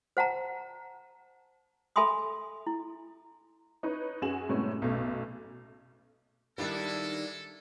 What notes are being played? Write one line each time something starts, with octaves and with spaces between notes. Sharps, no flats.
C5 F#5 A5 A#5
A4 E5 G#5 B5 C6 D#6
E4
D#4 B4 C#5
F#2 F#4 G#4 G#5 E7 F#7
A2 C3 G3 G#3 B3 C#4
B1 F#2 B2 A3
D#3 G3 G#3 A#3 D4 E4 A4